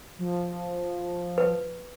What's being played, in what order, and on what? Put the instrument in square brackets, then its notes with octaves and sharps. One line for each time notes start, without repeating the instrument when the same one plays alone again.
[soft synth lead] F3
[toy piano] B4